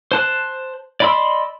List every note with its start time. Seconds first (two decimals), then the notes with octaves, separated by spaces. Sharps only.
0.12 C5 A5 F#6
1.00 D5 D#5 B5 C6 E6